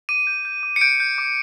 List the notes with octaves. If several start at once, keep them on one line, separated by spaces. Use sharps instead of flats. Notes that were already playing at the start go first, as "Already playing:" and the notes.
D6 D#7
G6
G6
D6
C#7
G6 D7
G6
D6